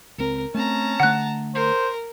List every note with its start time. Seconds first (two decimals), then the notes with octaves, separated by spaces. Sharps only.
0.18 C#2 C4 A#4
0.54 A3 C4 C#4 A5 A#5
1.00 D3 A3 F#5 F#6
1.54 A#4 C5